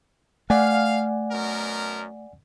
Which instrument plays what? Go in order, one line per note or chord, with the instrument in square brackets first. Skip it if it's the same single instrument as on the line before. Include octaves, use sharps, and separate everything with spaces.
[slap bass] A3 [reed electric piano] D5 F#5 G#5 [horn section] F5
[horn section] F#2 B2 A#4